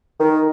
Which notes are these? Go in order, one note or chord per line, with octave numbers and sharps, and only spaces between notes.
D#3